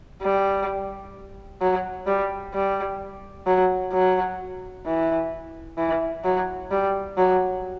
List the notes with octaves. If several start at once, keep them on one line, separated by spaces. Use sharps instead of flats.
G3
F#3
G3
G3
F#3
F#3
E3
E3
F#3
G3
F#3